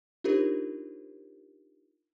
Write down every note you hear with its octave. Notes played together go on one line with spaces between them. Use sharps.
D4 D#4 F4 G4 A#4 C5